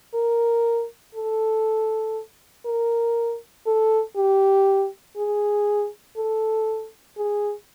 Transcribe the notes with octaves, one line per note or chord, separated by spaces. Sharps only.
A#4
A4
A#4
A4
G4
G#4
A4
G#4